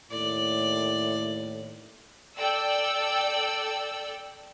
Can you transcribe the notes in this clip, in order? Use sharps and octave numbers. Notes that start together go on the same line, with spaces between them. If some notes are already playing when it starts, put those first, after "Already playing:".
D#2 A2 D5
A4 D5 G5 E6